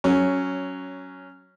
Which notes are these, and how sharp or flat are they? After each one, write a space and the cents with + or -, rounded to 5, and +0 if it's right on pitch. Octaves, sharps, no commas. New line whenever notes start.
F#3 +10 C#4 +0